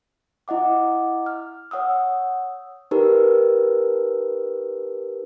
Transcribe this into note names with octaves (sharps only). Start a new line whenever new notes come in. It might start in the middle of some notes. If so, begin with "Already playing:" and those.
E4 D#5 F#5 D6
F6
C#5 F#5 D#6 E6
D#4 G4 A#4 B4